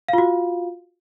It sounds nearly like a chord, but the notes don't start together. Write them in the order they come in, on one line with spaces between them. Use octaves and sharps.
F5 F4 F#4